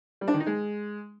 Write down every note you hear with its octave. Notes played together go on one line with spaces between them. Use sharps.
G3
D4
D#3
D#4
G#3